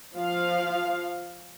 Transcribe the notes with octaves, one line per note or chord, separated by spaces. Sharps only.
F3 F5